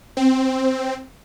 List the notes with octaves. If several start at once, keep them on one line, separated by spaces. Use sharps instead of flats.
C4